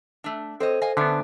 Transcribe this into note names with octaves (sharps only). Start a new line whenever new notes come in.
A3 D4
C4 A4 C5 C#5 D#5
D#5 F5 G#5
D3 B3 C#4 D4 E5